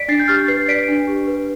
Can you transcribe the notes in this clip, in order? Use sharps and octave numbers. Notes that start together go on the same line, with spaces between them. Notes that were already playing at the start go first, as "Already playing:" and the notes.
Already playing: D5 B6 D7
D4 A6 C7
G6
G4 F6 A6
B4 A6 C7
D5 B6 D7
D4
G4
B4